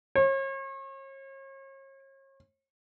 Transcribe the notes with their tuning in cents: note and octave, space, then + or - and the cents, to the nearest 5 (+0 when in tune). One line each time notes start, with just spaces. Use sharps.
C#5 -40